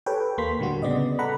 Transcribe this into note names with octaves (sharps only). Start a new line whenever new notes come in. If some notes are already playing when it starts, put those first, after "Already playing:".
G4 A4 B4 C#5 G5
D#2 A#3 C6 B6
A2 D3 G3 F#4
C#3 B3 D5 D#5
A4 F#5 A#5 B5